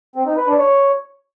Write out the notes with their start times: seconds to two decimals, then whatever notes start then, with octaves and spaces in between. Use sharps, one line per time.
0.16 C4
0.26 D#4
0.37 B4
0.47 D4
0.58 C#5